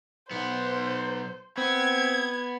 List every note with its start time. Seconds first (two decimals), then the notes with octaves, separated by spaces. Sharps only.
0.31 B1 B3 C5
1.57 B3 C4 G#6